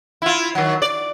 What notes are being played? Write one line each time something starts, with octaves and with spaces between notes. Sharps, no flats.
E4 F4
D#3 F#3
D5